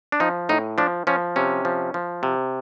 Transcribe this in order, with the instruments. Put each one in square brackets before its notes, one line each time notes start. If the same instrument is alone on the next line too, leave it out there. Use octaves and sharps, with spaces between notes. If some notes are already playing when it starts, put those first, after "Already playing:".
[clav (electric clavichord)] D4
F3 D#4
A2 D#4
F3 D4
F3 C#4
C3 C#4
F3
F3
C3